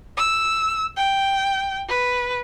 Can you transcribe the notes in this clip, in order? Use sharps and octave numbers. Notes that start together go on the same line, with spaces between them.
E6
G5
B4